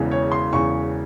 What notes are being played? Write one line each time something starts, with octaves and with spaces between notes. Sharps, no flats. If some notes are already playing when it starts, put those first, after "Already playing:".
Already playing: E1 E2 C#3 E3
C#5
C6
E1 E2 C#3 E3 C#6